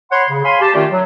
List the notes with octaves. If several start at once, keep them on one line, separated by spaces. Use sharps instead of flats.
C#5 F#5 B5 C6
C#3
C#5 F5 G#5 B5 C6
G4 A5
D#3 A3 C#4 F4 G4 D5
F#3